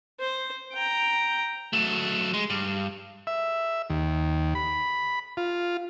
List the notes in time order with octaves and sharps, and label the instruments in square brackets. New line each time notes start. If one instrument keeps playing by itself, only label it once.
[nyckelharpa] C5
G5 A#5
[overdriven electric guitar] F#3 A3
G#3
G2
[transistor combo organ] E5
D#2
B5
F4